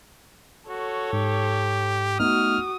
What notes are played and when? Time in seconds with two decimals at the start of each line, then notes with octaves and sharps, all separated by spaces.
0.70 F#4 A4 C#5
1.13 G#2 G4
2.19 A3 B3 D#4 F#4 D#6 F6